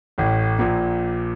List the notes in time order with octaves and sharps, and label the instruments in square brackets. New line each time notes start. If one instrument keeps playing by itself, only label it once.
[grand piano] A1 A2
A#1 A#2